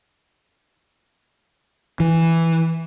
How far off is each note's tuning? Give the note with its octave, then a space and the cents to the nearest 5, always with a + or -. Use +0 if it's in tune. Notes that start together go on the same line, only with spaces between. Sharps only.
E3 +0